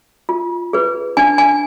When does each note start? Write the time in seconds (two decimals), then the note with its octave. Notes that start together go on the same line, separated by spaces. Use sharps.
0.29 F4
0.73 G#4 B4
1.17 D4 G#5
1.38 G#5